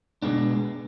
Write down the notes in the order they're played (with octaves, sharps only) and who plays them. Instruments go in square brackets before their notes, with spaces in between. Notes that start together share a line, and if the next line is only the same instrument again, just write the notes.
[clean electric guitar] B2 G#3 B3 D4